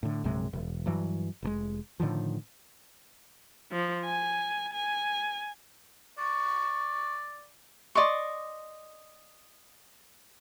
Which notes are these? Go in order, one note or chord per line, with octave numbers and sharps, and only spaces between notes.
A2 D3
A#1 F#2 C3 G#3
E1
G2 E3 F#3
F1 B2 G#3
A2 D3 D#3 F3
F3
G#5
G#5
D5 C#6
D5 D#5 C6 C#6